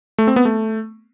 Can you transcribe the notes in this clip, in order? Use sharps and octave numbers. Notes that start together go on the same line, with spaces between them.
A3
C4
B3
A3